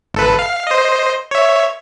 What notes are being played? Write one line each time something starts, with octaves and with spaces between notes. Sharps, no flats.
G#1 A4 B4
F5
C5 D#5
C#5 E5